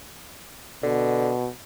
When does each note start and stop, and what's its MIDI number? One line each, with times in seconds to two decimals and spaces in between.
0.83 1.49 47
0.83 1.32 50